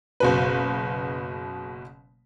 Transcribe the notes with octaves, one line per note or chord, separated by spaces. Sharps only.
F#1 B2 B4